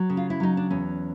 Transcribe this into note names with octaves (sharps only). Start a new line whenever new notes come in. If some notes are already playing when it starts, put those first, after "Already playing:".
Already playing: F#3
C#3
F4
E4
F#3 D#4
D4
E2 C#4